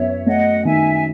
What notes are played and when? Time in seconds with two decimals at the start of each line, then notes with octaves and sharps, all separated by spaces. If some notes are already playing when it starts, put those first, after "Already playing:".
Already playing: F#2 B3 C#5 E5
0.26 A3 D#5 F#5
0.64 D#3 E5 G#5
0.93 G#5